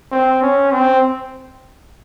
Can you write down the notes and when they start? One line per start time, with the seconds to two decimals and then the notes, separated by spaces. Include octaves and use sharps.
0.12 C4
0.42 C#4
0.73 C4